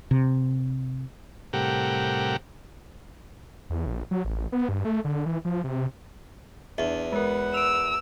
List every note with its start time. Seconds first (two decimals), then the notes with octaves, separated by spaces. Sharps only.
0.11 C3
1.53 A2 C3 G3 G4 A#4 F#5
3.70 E2
3.86 A#1
4.11 F#3
4.25 A1
4.52 B3
4.69 G2
4.85 A3
5.04 D3
5.26 E3
5.45 F3
5.64 C3
6.78 E2 D4 E5
7.13 G#3 A#4 B4 F#5
7.54 E6 D7 F7